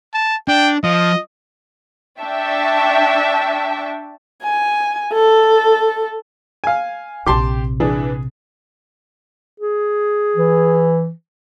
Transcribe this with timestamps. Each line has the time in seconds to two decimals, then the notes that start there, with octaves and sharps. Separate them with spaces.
0.14 A5
0.48 D4 G5
0.84 F3 D#5
2.21 D4 E5 G5 A5 C#6
4.43 G#5
5.14 A4
6.64 F5 G#5
7.26 A#1 C3 G4 A5 C6 D6
7.80 E3 D4 G#4
9.60 G#4
10.36 E3